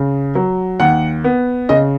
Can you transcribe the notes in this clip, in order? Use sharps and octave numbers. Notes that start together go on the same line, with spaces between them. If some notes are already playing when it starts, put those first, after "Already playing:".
Already playing: C#3
F#3
D#2 F#5
B3
C#3 D#5